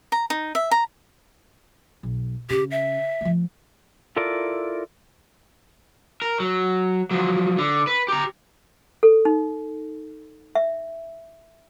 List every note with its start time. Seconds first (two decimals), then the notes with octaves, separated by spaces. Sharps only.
0.12 A#5
0.30 D#4
0.55 E5
0.71 A#5
2.03 B1
2.50 C#3 G4
2.71 E5
3.21 F3 A3
4.16 E4 F4 A4 A#4 D5
6.22 A#4
6.40 F#3
7.11 F3 F#3
7.58 D3
7.87 B4
8.08 G4 A#5
9.03 A4
9.25 D#4
10.55 E5